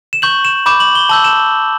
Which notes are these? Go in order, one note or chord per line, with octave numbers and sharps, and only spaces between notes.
E7
C#6 G6 F#7
E7
B5 D6 G6 E7
F#7
G7
A5 E6 G6 F#7
E7